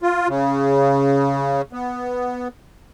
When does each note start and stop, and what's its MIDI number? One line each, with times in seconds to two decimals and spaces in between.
0.02 0.28 65
0.28 1.62 49
1.73 2.48 59